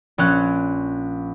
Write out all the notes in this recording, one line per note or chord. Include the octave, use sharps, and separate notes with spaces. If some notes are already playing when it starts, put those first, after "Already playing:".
A#1 C#4 F#6